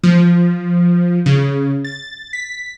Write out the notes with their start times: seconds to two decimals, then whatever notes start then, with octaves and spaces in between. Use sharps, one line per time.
0.03 F3
1.26 C#3
1.84 A6
2.33 B6